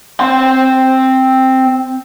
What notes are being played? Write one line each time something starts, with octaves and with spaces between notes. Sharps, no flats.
C4 C6